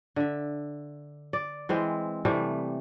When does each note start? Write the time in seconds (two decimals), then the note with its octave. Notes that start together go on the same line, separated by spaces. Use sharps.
0.16 D3 E5
1.33 D5
1.69 E3 G#3 C4
2.25 C3 E3 G3 A3